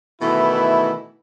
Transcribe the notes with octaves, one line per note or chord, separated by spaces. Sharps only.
B2 D#3 E3 A3 E4